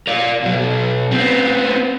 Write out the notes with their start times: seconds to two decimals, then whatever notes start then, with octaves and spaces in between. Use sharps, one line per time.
0.07 A#4 D5
0.43 B2 F#3
1.11 B3 C4